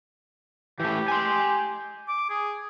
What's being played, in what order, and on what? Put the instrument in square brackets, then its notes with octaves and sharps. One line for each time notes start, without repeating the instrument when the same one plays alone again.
[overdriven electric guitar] E3 A3 [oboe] G4
[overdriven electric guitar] G#5 C6
[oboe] D6
G#4